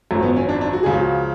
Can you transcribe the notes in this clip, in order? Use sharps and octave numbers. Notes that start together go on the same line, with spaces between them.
G#1 F#2 F3 A3
B3
C#4
D4
D4
F#4
C#2 C#3 F3 G#4
F#4